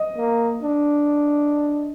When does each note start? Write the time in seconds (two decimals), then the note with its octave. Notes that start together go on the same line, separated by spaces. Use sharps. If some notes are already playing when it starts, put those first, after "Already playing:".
Already playing: D#5
0.17 A#3
0.63 D4